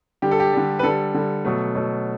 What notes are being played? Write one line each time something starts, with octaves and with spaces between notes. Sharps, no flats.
D3 G3 G4
A4
G4
D3 G3
B4
D3 G3 A4
D3 G3
B2 F#3 A3
B2 F#3 A3